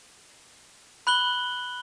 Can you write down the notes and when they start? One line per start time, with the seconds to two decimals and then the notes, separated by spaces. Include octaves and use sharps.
1.07 B5 F#6 F#7 G7